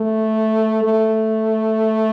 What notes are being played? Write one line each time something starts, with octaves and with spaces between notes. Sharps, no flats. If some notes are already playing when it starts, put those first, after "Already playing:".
Already playing: A3
A3